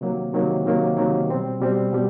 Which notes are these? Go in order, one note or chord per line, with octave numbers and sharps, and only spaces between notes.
C3 D#3 F#3 A#3
C3 D#3 F#3 A#3
C3 D#3 F#3 A#3
C3 D#3 F#3 A#3
B2 G3 C4
B2 G3 C4
B2 G3